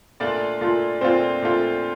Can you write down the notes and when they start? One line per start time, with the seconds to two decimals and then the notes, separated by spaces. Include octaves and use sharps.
0.20 A#2 A3 D4 F4 D5
0.61 A#2 A3 D4 F4
1.01 A#2 A3 C4 D4 F4 C5
1.42 A#2 A3 D4 F4